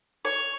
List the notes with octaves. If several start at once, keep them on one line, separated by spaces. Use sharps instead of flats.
C#5